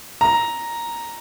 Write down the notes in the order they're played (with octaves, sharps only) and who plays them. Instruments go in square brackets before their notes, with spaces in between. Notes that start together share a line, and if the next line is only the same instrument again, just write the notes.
[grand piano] A#5